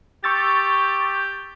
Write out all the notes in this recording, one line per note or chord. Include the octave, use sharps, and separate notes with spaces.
G4 C#6 E6 G6 A6